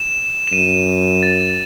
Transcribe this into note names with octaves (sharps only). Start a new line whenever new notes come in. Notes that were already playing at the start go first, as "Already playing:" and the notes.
Already playing: E7
E7
F#2 D#7
A6
A6